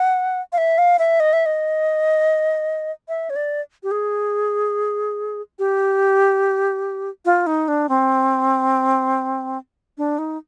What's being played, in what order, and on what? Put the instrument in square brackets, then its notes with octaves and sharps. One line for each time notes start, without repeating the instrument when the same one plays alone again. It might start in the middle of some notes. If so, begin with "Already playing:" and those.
Already playing: [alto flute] F#5
F5
E5
F5
E5
D#5
E5
D#5
E5
C#5
D5
G4
G#4
G4
F4
D#4
D4
C4
D4
D#4